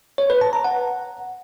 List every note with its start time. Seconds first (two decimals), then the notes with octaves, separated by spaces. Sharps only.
0.18 C#5
0.30 B4
0.41 A5
0.53 A#5
0.64 F#5